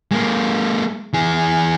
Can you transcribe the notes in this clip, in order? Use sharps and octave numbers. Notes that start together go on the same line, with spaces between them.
G#3 A#3
E3 G#4